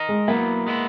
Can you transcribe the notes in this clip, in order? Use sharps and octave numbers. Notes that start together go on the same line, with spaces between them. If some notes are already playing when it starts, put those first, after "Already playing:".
Already playing: A#4 D#5
G#3
F#3 A#3 B3 E4
G#3 B3 E4